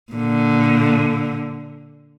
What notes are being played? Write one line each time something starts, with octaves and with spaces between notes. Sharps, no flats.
A#2 D3